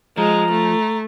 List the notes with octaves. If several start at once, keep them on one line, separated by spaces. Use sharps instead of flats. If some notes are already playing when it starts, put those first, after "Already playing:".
F3 G#3 A#5
A3